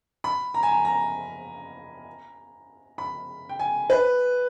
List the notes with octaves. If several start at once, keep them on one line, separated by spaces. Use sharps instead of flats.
B5
A#5
G#5
A#5
A#5
B5
G5
G#5
B4